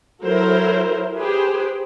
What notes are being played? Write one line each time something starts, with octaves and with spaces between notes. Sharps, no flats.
F#3 E4 A4 A#4 C5
G4 G#4 B4 C5